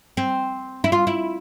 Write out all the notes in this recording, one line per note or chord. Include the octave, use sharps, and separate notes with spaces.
C4
E4
F4
E4